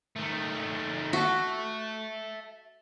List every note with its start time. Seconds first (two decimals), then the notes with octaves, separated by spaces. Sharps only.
0.16 D#3 A3
1.13 F#4 E5 A5